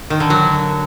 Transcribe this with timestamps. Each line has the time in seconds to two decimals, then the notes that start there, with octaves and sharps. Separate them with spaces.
0.10 D#3
0.20 D3
0.30 F#3